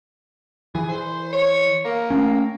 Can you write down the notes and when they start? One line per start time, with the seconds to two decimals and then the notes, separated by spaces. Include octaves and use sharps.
0.75 E3 G#4
0.89 C5
1.33 C#5
1.85 A#3
2.10 A3 C#4